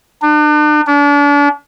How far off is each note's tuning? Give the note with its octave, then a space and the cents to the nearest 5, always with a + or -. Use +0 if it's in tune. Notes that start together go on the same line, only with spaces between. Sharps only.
D4 +40
D4 -35